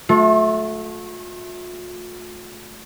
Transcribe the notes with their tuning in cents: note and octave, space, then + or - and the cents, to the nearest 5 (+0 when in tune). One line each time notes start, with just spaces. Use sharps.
A3 -15 F4 +45